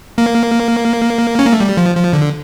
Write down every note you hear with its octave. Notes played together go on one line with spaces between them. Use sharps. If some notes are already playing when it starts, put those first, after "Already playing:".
A#3
C#4
A#3
A3
G3
F3
F3
D3